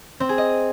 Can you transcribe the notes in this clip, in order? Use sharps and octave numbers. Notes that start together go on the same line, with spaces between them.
C4
G#4
D#5